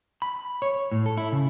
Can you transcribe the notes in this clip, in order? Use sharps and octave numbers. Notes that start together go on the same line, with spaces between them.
B5
C#5
A2
A4
E4
C#3